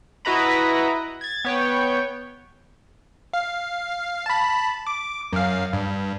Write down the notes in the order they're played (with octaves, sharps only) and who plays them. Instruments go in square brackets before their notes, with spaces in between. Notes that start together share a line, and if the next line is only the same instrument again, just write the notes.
[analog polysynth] E4 F#4 B4 D#5 A#5 B5
G#6 A6
B3 C#5 G5
[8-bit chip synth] F5
A5 B5
D6
F#2 F5
G2